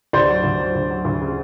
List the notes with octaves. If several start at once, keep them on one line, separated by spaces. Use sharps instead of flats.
D2 C5 D5
F#3
D2
F#3
D2
F#3
D2
C#3